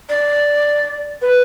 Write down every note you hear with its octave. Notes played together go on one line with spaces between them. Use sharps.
D5
B4